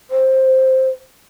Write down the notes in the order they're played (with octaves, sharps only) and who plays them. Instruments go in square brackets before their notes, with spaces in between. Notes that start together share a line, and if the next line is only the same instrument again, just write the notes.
[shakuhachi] C5